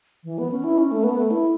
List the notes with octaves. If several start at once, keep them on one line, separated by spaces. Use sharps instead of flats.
E3
B3
C#4
E4
C#4
A3
B3
A3
E4